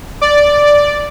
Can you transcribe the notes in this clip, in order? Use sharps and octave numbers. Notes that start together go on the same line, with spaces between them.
D5